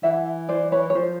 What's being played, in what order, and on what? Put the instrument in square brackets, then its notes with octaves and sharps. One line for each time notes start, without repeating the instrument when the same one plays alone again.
[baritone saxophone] E3 [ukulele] E5 F#5
[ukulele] C5 D5
B4 C#5
C#5
[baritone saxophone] F3 [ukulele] C5